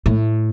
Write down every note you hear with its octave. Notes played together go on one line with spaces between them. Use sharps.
A2